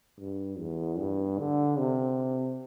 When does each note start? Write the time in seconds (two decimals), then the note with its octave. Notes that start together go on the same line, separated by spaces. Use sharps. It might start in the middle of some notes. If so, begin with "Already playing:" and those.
0.19 G2
0.59 E2
0.99 G2
1.39 D3
1.79 C3